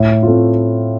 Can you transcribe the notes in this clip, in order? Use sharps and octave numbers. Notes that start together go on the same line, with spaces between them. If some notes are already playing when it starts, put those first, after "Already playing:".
Already playing: A2
A3 C4 F4